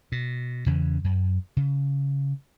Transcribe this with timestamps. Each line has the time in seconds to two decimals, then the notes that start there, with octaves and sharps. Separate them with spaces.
0.12 B2
0.66 E2 C#3 E3 C#4
1.04 F#2
1.57 C#3